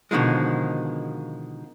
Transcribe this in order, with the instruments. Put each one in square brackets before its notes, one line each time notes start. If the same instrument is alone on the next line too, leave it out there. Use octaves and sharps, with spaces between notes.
[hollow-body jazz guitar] B2 D3 D#3 F3 G#3